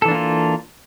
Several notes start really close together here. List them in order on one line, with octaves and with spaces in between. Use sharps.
A4 E3 D4 A#3 F4